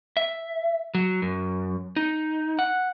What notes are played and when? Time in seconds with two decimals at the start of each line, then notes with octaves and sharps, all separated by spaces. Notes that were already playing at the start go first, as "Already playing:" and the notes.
0.17 E5
0.95 F#3
1.22 F#2
1.96 D#4
2.59 F#5